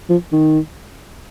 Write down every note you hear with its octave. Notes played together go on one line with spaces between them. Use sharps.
F3
D#3